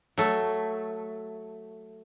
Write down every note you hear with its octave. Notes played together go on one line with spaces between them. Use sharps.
F#3 A3